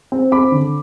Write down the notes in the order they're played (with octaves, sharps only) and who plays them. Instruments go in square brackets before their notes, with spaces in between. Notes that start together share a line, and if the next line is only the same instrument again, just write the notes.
[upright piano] C4
C4 B5 D6
D3